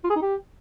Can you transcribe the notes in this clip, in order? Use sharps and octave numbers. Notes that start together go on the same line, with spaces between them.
F4
G#4
D#4
G4